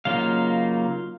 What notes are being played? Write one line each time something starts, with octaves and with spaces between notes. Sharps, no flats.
C#3 F#3 A#3 D#4 F4 F5